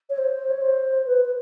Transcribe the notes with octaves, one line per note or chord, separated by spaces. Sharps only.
C#5
C5
C#5
C5
B4
B4